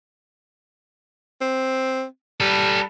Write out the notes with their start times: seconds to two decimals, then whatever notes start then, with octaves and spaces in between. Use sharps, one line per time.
1.41 C4
2.40 G3 A4 B4